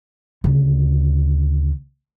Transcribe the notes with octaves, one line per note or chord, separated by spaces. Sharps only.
D2 C#3